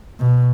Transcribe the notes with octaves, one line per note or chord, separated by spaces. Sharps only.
B2